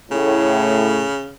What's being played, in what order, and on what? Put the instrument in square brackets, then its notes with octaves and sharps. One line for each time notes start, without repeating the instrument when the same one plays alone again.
[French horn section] A2 [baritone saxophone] C#3